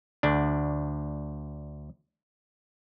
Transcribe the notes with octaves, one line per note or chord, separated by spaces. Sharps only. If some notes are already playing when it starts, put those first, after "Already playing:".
D2 D4